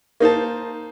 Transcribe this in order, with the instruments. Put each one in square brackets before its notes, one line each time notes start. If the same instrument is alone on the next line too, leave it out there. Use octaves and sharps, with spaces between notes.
[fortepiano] A#3 D#4 C5 A5